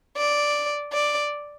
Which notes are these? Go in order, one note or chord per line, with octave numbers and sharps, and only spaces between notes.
D5
D5